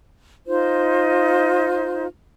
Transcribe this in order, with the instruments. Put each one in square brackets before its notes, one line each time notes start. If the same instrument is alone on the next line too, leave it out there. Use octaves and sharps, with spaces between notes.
[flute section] D#4 F4 C5